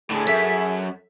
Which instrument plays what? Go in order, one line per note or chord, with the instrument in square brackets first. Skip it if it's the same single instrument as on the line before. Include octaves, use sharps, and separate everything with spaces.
[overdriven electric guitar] A2 D3 [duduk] G#4
[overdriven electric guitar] F#2 [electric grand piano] A4 E5 [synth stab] B6